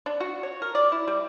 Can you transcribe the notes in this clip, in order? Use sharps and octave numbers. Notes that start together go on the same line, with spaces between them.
D4
F#4
C#5
A#4
D5
E4
G3